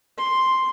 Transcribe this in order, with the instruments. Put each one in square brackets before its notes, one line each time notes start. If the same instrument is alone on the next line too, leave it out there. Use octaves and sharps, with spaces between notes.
[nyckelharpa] C6